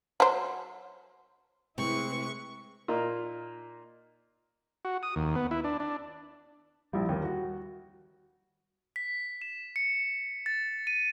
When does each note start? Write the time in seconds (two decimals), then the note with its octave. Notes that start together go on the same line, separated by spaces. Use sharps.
0.20 F#3 C5
1.78 C3 G#3 A3 C4 E4 G#4 B4 C#6
2.88 A#2 A#3 D#4 F4
4.85 F#4
5.03 D#6
5.16 D#2
5.35 B3
5.51 E4
5.64 D4
5.80 D4
6.93 A#1 G3 E4
7.09 D#2 A#3
7.24 F#4
8.96 B6
9.42 E7
9.76 C#7
10.46 A6
10.87 D#7